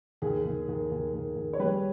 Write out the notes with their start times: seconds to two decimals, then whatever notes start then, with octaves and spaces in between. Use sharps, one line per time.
0.22 D#2 G#4
0.45 D#2
0.68 D#2
0.91 D#2
1.14 D#2
1.36 D#2
1.53 C#5
1.60 G3 B4